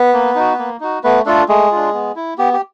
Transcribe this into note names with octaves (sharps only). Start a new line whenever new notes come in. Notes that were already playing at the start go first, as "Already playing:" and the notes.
Already playing: B3 B4
A#3
D#4 F#4
A#3
D#4 F#4
A3 B3 B4
A3 D4 F4 A4
G#3 A3 G#4
D4 F4
B3
E4
B3 G4
G4